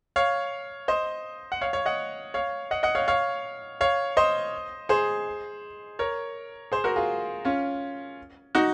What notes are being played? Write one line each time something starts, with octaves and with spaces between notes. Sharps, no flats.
C#5 F5
C5 D#5
F#5
C#5 F5
C#5 F5
D#5 F#5
C#5 F5
D#5 F#5
D#5 F#5
C#5 F5
C#5 F5
C#5 F5
C5 D#5
G#4 C5
A#4 C#5
G#4 C5
F#4 A#4
F4 G#4
C#4 F4
D#4 F#4